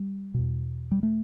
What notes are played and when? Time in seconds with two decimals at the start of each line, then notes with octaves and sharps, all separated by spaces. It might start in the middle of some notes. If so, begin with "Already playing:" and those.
Already playing: G3
0.34 E2 B2
0.91 G3
1.03 A3